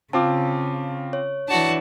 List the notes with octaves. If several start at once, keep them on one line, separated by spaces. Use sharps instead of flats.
C#3 C4 F4 A5 D6
C#5
E3 D4 F#4 A5